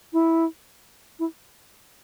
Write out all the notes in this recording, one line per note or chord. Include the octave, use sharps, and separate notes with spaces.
E4
E4